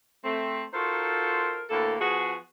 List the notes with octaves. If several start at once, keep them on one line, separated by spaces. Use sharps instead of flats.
A3 C4
D#4 F4 F#4 A4 A#4 C5
D2 A2 A#3 A4
F3 B3 F#4 G#4